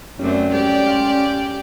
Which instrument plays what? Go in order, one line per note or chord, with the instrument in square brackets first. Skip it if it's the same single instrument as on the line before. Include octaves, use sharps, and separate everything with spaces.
[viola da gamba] F#2 A3 C4 [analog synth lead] C#4 [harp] G4 D5
[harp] G#3 A4 G#6 [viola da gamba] G4 D5
[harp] F5 G5 C6
G#6